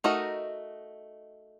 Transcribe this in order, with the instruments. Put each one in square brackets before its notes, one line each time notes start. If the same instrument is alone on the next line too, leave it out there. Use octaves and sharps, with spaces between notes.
[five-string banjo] A3 D#4 F#4 A#4 D#5